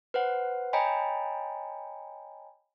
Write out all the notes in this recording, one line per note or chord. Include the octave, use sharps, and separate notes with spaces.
B4 C5 F#5
C#5 D#5 G5 G#5 A#5 B5